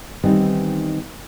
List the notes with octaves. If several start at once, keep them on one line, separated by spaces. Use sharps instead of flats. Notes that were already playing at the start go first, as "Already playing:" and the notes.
D#3 E3 G3 B3 C4 D#4